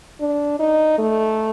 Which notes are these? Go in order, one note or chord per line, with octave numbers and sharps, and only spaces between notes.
D4
D#4
A3